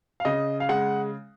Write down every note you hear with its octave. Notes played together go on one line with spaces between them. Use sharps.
F5
C#3 D#5
F5
G#3 F#5